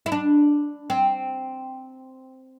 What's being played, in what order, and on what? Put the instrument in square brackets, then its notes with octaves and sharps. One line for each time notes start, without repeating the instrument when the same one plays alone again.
[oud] E4
D4
C4